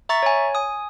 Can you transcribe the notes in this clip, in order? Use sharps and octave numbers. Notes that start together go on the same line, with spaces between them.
E5 A#5 C#6 A6
C#5 G#5
G#5 D#6